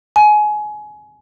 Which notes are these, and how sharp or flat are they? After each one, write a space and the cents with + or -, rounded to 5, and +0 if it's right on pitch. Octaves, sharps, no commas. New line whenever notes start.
G#5 +25